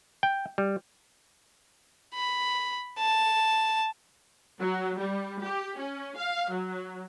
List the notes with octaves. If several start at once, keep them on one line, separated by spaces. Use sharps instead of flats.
G5
G3
B5
A5
F#3
G3
G4
C#4
F5
F#3